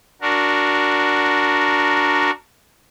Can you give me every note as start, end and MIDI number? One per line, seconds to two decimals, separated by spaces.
0.22 2.31 62
0.22 2.31 66
0.22 2.31 70